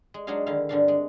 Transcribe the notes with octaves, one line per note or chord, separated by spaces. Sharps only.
G#3
F#3 G#3 D4 D#4 G#4 F5
D3 D#3 E4 F5
G2 D3 C4 D4 A#4 F5
G#3